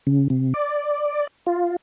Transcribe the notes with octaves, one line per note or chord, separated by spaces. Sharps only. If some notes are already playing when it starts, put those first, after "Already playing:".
C#3
C3
D5
F4